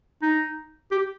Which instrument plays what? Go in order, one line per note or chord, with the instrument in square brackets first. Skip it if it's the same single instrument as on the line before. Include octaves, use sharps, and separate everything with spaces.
[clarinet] D#4
G4